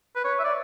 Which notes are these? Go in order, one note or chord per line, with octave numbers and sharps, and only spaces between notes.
B4
C#5
E5
D5